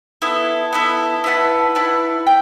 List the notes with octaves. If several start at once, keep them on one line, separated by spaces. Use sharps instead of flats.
B3 E4 A4
B3 E4 A4
E4 B4 F#5 A5
E4 B4 F#5 A5
G5